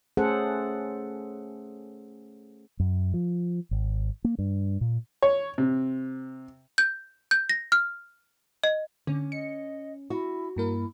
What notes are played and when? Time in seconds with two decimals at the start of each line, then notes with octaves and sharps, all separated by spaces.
0.17 A3 C#4 G#4 A4 C5 F#5
2.80 F#2
3.14 F3
3.71 G#1
4.24 A#3
4.39 G2
4.81 A#2
5.22 C#5
5.58 C3
6.78 G6
7.31 G6
7.49 A#6
7.72 F6
8.64 D#5
9.07 D3 C#4
9.32 D#5 C#7
10.10 E4 F#4
10.56 G2 A#3 E4 A#4